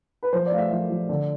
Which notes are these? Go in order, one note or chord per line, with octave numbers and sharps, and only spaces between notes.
B4
F3 C5
D5
A3 F5
E5
F3 E5
F3
D3